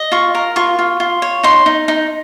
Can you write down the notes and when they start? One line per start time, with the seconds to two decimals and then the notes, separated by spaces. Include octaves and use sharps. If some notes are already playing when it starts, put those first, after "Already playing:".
Already playing: D#5
0.12 F4 C#6
0.35 A#4
0.56 F4 C#6
0.79 F4
1.00 F4
1.22 C#5
1.43 D#4 C6
1.66 D#4
1.88 D#4